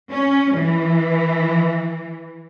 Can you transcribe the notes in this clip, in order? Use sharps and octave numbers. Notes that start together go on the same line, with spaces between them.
C#4
E3